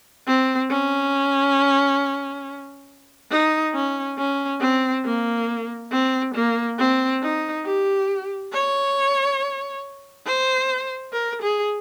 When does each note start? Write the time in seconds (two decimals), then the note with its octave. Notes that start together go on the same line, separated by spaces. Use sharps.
0.27 C4
0.70 C#4
3.31 D#4
3.74 C#4
4.18 C#4
4.61 C4
5.05 A#3
5.92 C4
6.34 A#3
6.79 C4
7.23 D#4
7.65 G4
8.53 C#5
10.27 C5
11.13 A#4
11.42 G#4